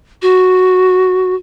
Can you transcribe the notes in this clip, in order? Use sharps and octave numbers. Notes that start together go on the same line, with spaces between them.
F#4